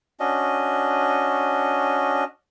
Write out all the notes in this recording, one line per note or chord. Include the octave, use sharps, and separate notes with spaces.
C#4 D4 F#4 D#5